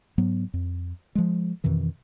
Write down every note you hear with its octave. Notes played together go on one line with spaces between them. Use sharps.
G#2 F#3 B3
F2
F3 G#3
F2 B2 D#3 E3